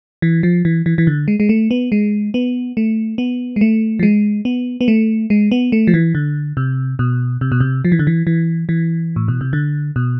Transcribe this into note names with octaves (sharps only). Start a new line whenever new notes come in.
E3
F3
E3
E3
E3
D3
G#3
G#3
A3
B3
G#3
B3
A3
B3
G#3
A3
F3
G#3
B3
B3
A3
G#3
B3
A3
F3
E3
D3
C3
B2
C3
B2
C3
F3
E3
D3
E3
E3
E3
A2
B2
C3
D3
B2